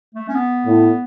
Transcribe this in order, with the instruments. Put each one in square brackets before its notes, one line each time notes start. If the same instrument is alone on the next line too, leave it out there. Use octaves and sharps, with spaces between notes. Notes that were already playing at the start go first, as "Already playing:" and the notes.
[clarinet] A3
C#4
B3
[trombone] A2